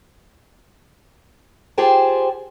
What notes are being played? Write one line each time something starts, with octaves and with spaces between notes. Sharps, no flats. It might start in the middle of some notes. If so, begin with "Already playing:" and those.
F4 G4 G#4 C5 G5 A5